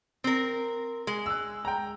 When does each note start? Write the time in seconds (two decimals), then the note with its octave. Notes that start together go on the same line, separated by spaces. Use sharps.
0.24 C4 A#4
1.07 G#3
1.26 E6 F#6
1.65 G5 A#5